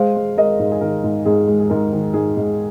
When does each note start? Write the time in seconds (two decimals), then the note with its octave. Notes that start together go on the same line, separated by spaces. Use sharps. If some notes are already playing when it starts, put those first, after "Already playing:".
Already playing: G#3 C5 F5
0.16 G#3
0.37 G#3 A#4 D#5
0.60 G#2
0.72 G#4
0.81 D#3 A#4
1.04 G#2
1.26 G#2 G#4
1.47 G#3
1.60 G#4
1.70 G#2 A#4
1.93 D#3
2.14 G#2 G#4
2.37 G#2